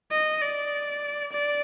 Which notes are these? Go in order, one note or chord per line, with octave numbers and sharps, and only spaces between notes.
D#5
D5
D5